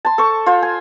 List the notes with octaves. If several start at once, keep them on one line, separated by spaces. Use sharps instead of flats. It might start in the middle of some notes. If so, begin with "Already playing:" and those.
A5 C6
A4 C5 C#6
F4 C5
G#5